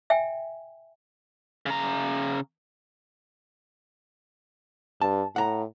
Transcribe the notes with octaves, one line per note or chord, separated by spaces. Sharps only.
E5 G5 G#5
C#3 A#5
G2 A5
A2 F#5 A#5